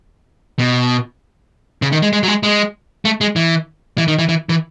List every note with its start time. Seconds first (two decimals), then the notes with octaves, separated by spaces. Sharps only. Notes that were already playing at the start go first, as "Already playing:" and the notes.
0.59 B2
1.82 C#3
1.92 D#3
2.02 G#3
2.13 G#3
2.23 F#3
2.28 G#3
2.43 G#3
3.05 A3
3.21 G#3
3.36 E3
3.98 E3
4.08 D#3
4.19 E3
4.29 E3
4.49 E3